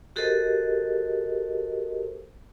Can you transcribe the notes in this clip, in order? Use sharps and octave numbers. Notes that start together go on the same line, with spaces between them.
F#4 G4 A4 A#4 C5 D#5